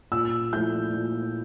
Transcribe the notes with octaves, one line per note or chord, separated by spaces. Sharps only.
A#2 E6
F3 A3 E4 G6
A#2